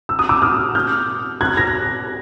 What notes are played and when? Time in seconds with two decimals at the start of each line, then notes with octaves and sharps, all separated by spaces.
0.09 E6
0.19 D#6
0.29 D6 E6
0.42 D#6 F6
0.75 F6 G6
1.41 F#6 G#6
1.57 G#6 A#6